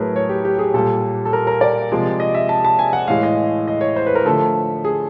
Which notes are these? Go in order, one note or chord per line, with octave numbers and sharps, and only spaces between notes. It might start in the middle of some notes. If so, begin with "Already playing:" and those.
Already playing: A2 F#3 A3 G#4 A#4 B4
C#5
G4
G4
G#4
A#2 G3 A4
A4
A#4
A#4
D5
C3 F3 G#3
D#5
E5
A5
A5
G#5
F#5
A2 E3 G#3 F5
D#5
D#5
C#5
C5
B4
A#4
D3 F3 A3 A4
G#4